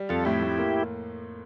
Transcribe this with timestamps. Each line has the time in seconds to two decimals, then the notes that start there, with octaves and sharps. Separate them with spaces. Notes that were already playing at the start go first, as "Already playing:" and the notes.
Already playing: G3
0.09 F2 F4 A4
0.25 A2 E4 G4
0.42 A2
0.58 A#3